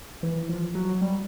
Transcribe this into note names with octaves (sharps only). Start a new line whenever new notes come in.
E3
F3
F#3
G3